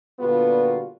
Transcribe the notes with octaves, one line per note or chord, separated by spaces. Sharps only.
A#2 D3 G3 B3 F4 F#4